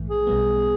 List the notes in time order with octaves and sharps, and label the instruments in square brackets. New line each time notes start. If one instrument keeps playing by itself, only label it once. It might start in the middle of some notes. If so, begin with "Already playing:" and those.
Already playing: [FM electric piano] A#1 G#2 E3 A3
[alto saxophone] G#4
[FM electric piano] B1 B2 G3 B3